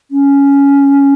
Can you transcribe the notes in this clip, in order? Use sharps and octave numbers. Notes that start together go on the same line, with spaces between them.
C#4